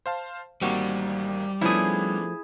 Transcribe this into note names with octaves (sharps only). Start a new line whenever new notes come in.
C5 F5 A5
A1 D#3 G3 A#3 C4 F#4
F3 A3 B3 C#4 D4 E4 G#4